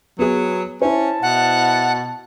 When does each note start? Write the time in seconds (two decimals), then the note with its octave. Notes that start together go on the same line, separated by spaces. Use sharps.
0.19 F#3 B3 G#4
0.82 C#4 E4 C5 A5
1.22 B2 F#5